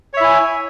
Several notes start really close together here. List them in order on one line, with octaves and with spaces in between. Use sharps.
C#5 E5 E4 G#5